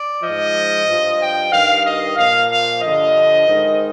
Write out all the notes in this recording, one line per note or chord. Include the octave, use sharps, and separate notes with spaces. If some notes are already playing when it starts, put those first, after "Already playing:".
Already playing: D5
G#2 F3 D#5
G2 F3
G5
G2 D#3 F5
D#5
A#2 F3 F5
F5
G2 D3 F3 D#5
G#2 D#3